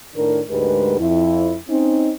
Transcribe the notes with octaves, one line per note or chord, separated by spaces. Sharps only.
A2 D#3 D4 A#4
D2 G#2 G#3 G4 A#4 B4
F2 E4
C4 C#4 D#4